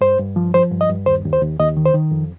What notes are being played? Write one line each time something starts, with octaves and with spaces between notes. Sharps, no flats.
G2 C5
G2
F3
F3 C5
G2
D#5
G2
D#2 C5
D#2
C5
D#2
D#2 D#5
D#3
C5
D#3
F2